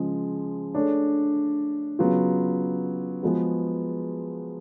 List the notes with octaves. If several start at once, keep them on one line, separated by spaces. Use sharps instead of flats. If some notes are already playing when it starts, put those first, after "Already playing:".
Already playing: C#3 F3 G#3
A3 D4 G#4 C#5
C#3 F#3 B3 F4 G#4
F3 G#3 B3 F#4 B4